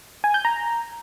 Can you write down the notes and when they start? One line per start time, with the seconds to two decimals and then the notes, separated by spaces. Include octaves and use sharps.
0.24 G#5
0.34 G6
0.45 A#5